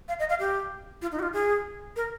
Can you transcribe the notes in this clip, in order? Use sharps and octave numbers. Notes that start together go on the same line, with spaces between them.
F5
D#5
F5
G4
F4
D#4
G4
F4
G#4
A#4